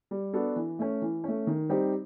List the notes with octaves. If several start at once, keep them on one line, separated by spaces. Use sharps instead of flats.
G3
B3 D4 F#4 A4
E3
A3 C#4
E3
A3 C#4
D#3
G3 C4 D#4 G4